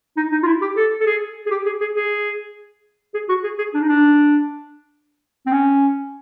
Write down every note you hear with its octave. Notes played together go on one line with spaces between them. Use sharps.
D#4
D#4
F4
E4
G4
A4
A4
G#4
G#4
G4
G#4
G#4
G#4
G#4
F#4
G#4
G#4
D4
D#4
D4
C4
C#4